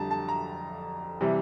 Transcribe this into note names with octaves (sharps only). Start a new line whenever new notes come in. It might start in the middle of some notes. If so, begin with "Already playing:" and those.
Already playing: F2 D3 G3 A5 A#5
A5
A#5
C3 E3 G3